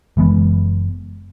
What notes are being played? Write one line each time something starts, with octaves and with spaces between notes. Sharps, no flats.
F#1 E3 G#3 B3